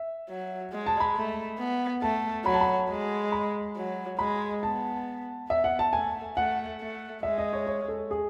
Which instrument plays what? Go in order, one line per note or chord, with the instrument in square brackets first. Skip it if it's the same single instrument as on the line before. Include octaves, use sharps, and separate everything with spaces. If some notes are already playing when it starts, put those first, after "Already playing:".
Already playing: [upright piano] E5
[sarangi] F#3
G#3
[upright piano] A5
B5
[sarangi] A3
B3
[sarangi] A3 [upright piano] A5
[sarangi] F#3 [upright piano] B5
[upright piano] A5
B5
[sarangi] G#3
[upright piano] B5
[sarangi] F#3
[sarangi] G#3 [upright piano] B5
[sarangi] B3 [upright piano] A5
[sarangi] B3 [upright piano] E5
[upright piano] F#5
A5
[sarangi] A3 [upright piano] G#5
[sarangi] A3 [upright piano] F#5
[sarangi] A3
[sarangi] G#3 [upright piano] E5
[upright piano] D#5
C#5
C#5
A4
G#4